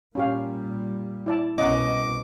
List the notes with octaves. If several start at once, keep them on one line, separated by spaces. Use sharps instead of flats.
A#2 G3 C#4 G4 F5
E4 D5 A5
C2 B2 C#4 D#5 F#5 A#5 D6